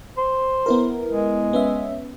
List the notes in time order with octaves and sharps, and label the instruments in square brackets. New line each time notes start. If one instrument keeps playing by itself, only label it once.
[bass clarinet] C5
[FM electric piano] B3 E4 A#4
[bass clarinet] G#3
[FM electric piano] B3 C#4 E5